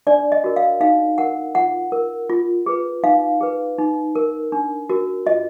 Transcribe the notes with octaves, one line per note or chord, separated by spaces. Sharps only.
D4 D5
D#5
F#4 A#4
F5
D#4 F5
A#4 F#5
F4 F#5
A#4
F4
G#4 B4
D#4 F5
G#4 B4
D#4
A#4
D4
F#4 A#4
F4 D#5